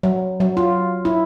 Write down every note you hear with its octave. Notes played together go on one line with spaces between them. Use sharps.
F#3
F#3
F4
E4